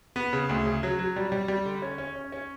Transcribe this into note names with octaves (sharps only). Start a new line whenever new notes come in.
B3
C#3
D2
C#3
F#3
F#3
G3
G3
G3
D3
C#4
C#4
C#4
C#4